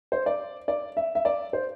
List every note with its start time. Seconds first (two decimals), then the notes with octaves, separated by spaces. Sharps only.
0.12 C5
0.26 D5
0.68 D5
0.97 E5
1.15 E5
1.25 D5
1.53 C5